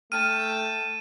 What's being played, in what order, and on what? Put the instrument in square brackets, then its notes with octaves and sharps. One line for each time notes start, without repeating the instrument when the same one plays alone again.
[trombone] A3 [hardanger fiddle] G5 A5 [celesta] F6 [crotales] D#7